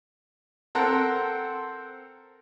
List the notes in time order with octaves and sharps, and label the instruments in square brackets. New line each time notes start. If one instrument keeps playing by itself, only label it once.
[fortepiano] C4 A4 A#4 F#5 A5 A#5